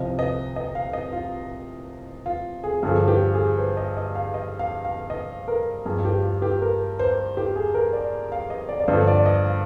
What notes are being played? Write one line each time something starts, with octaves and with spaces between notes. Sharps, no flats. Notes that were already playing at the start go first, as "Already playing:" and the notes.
Already playing: C2 C3 F3 D#5
D#5
D#5
F5
D#5
F4
F4
G#4
G2 D3 F3 G#4
G4
G#4
C5
D#5
D#5
F5
D#5
F5
F5
D#5
A#4
G2 F3 G#4
G4
F4
G4
A#4
C5
G4
G#4
A#4
D5
F5
D#5
D5
D5
G2 D3 F3 C5
D5
D#5
F5